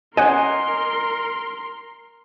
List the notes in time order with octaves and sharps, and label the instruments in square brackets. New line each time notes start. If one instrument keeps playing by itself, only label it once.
[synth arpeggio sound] C#4 F#5 G#5 [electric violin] A#4 C6 [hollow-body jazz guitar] D#5